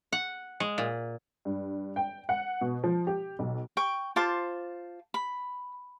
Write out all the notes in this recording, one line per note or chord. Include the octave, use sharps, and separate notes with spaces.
F#5
G#3
A#2
G2
G5
F#5
B2
F3
G4
B1
G5 C#6
F4 C5 A5 D6
B5